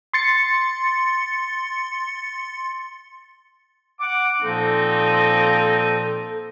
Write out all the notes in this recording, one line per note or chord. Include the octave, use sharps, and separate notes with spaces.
C6 A6 C#7
F#5 D6
A#2 F3 A#3 C4 D#4 A4